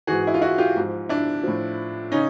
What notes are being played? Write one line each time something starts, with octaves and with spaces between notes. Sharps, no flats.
G#2 E3 F#4 G#4
E4
F4
E4 F#4
F4 G4
G#2 F3
D4 E4
A2 F3
C#3 C#4 D#4